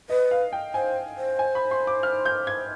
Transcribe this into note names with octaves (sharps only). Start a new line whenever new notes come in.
B4 D#5
F5
G5
C5 G#5
C5
G#5
B5
C6
D6
F6
G6
G#6